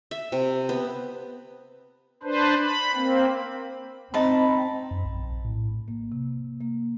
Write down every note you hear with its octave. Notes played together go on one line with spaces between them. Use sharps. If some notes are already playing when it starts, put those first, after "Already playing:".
E5
C3
B3
D4 B4 C5
B5
A#3 C4
C4 D#4 A5 B5
F#2
A#1
A2
A#3
C3
A#3